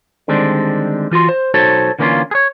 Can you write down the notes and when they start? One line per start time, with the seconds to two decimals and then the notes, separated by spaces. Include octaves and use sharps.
0.28 D3 D#3 G3 G#3 C4 D4
1.11 E3 F4 F#4 C6
1.29 C5
1.54 B1 D#4 F#4 A4 C5 C#5
1.99 D3 E3 A#3 C4 C#4 F4
2.31 G#4 C#5